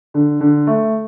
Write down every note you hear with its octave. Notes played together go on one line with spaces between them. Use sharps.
D3
D3
A3